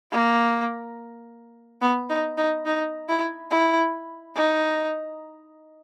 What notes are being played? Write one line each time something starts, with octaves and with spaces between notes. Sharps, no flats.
A#3
B3
D#4
D#4
D#4
E4
E4
D#4